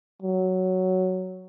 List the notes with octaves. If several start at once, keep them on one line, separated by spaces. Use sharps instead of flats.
F#3